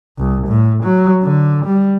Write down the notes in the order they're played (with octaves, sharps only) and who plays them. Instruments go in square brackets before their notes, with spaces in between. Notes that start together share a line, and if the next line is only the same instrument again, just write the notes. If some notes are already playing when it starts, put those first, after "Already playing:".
[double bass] C2
A2
F#3
D3
G3